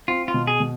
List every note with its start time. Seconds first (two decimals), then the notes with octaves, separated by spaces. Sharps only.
0.08 C4 F4
0.28 F4
0.34 B2
0.47 G#4
0.60 B2